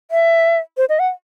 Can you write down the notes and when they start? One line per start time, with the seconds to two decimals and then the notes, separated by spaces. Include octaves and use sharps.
0.11 E5
0.77 C5
0.89 D#5
0.99 F#5